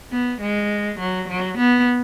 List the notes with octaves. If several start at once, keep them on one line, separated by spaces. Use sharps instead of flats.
B3
G#3
F#3
F#3
B3